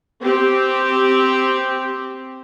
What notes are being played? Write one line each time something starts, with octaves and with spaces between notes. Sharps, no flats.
C4 G4